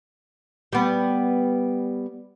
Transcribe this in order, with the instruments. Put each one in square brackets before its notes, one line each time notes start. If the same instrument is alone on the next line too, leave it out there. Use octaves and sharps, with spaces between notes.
[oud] G3 B3